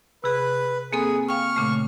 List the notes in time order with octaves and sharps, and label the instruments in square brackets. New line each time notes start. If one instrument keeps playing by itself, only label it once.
[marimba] C3 G#4 [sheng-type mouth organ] B4
[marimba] A#3 C4 A4 [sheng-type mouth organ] G#4
[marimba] F5 G5 [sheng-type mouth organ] C#6 F6
[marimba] A#2 C#3 A3